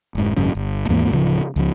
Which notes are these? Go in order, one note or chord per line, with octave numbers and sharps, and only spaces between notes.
F1 G#2
G#1 F#2 C#3
G1
D#2 G#2 E3 A#3
D1 C#3 F3
C#2 F3